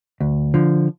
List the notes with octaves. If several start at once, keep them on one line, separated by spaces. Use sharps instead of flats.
D2
D3 F3